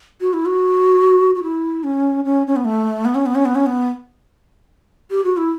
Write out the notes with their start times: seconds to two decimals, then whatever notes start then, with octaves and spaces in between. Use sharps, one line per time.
0.21 F#4
0.33 E4
0.46 F#4
1.35 F#4
1.43 E4
1.84 C#4
2.25 C#4
2.47 C#4
2.56 B3
2.65 A3
3.05 B3
3.15 C#4
3.26 B3
3.35 C#4
3.45 B3
3.55 C#4
3.66 B3
5.11 G4
5.24 F#4
5.37 E4